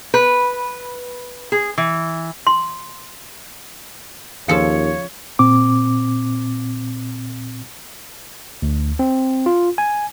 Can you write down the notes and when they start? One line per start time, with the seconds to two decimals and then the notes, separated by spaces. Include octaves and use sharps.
0.14 B4
1.52 G#4
1.78 E3
2.47 C6
4.48 D#2 C#3 F3 A4 C#5 F5 C#7
5.39 A#2 C4 D6
8.62 D2
8.99 C4
9.46 F4
9.78 G#5